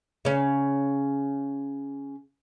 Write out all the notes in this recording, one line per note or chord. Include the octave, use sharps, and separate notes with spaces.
C#3 C#4